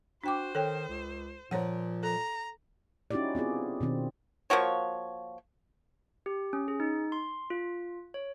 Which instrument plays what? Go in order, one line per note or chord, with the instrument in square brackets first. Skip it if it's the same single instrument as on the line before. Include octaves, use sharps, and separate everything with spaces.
[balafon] D4 G5 D6 [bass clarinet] F#4 [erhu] C5
[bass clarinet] D#3 [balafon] A4 C#5 G5
[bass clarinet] C#2
[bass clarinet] A#2 [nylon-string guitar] F3 A#4 [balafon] C5 C#5 F#5
[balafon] A4 [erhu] A#5
[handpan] C#4 D#4 E4 F#4 G4 D5
B3 C4 F4 G#4
B2 D#3 C4 D4
[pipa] F3 A#3 F#4 C#5
[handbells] G4
C#4
G#4
D#4
C6
F4
C#5